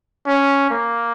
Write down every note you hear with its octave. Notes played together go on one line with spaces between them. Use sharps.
C#4
A#3